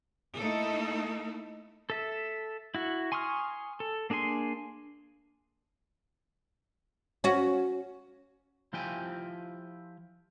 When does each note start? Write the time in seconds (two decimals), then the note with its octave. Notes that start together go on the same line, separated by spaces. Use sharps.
0.36 A3 A#3 D#4 E4 A4
1.90 A4 E5
2.75 E4 F#4
3.12 G#5 C6 C#6 D#6 F6
3.80 A4
4.10 A#3 D4 G#4 G#5 C6
7.24 C#4 F#4
8.73 F3 E4 F4 G4 G5 G#5